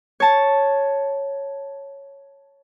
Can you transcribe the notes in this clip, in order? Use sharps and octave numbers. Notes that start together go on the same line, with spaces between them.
C#5 A5